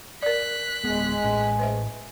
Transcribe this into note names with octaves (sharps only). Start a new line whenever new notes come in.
A#4 D5 F#6 B6
D1 G#3 B3
A2 C#4
B4 C5 E5